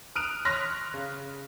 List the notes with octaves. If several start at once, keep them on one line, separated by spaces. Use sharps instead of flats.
D#6 F6 F#6 D7 D#7 F7
C#5 C6 F6 F#6 A#6 B6
C#3